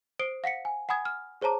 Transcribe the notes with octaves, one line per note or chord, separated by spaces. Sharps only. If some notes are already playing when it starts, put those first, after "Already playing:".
C5 D#6 C7 D7 G7
F5 F#5 B6 C#7
G#5
F#5 G#5 B5 D#6 G#6
F6
G#4 C5 C#5 A5 A#5 D6